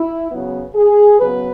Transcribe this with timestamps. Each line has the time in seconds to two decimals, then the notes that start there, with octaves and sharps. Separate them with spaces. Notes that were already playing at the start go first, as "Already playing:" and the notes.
Already playing: E4
0.30 C#3 F#3 B3
0.75 G#4
1.19 C#3 F#3 B3 B4